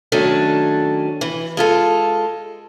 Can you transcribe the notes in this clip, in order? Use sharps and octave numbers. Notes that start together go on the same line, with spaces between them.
D#3 F#3 A3 C#4 D4 A4
E3
G#3 F4 A4